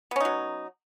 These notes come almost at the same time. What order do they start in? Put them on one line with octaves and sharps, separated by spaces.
B3 C#4 D#4 F#3